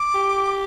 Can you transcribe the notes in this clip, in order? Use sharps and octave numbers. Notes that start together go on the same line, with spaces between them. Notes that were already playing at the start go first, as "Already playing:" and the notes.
Already playing: D6
G4